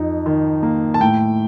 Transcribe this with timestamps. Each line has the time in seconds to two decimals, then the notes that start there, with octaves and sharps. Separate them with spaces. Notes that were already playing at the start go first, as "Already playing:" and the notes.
Already playing: F2 D#4
0.26 D#3
0.63 A#3
0.94 A5
1.01 A2 G5